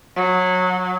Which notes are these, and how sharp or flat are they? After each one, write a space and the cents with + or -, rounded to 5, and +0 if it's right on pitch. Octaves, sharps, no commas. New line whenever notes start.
F#3 -20